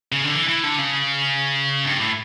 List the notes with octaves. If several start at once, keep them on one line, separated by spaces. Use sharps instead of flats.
C#3
D3
E3
E3
D3
C#3
G2
A2